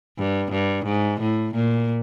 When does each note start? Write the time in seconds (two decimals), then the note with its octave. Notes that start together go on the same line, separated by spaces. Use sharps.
0.18 G2
0.52 G2
0.85 G#2
1.20 A2
1.55 A#2